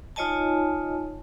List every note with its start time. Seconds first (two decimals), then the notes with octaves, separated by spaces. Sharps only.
0.16 D#4 F4 C#5 D#5 G#5 A5